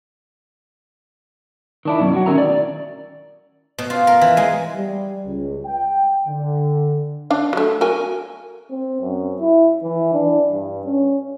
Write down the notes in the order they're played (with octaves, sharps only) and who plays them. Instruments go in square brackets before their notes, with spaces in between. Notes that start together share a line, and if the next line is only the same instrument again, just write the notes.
[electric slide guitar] D#3 D4 E4
F#2 B2
F#3 E4 F#4
A2 D#3 C#4 A#4 E5 A#5
D5
[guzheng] B2
F4
A#4
E3
G#3
[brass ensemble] G3
C#2
G5
D3
[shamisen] D4 F5
F#3 A3
F#4 A#4 G#5
[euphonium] C4
F#2
E4
E3
D4
G2
C#4